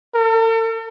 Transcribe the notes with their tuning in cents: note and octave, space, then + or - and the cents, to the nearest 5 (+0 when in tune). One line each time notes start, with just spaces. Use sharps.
A4 +45